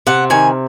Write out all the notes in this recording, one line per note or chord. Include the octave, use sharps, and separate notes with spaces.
C3 F#5
D#3 G#5